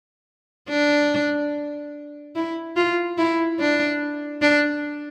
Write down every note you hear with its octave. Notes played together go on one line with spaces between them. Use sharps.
D4
E4
F4
E4
D4
D4